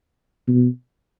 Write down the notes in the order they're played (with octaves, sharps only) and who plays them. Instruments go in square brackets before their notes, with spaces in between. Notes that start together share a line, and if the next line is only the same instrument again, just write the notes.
[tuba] B2